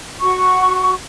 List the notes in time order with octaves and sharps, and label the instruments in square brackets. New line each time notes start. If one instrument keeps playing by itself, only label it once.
[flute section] F#4 C#6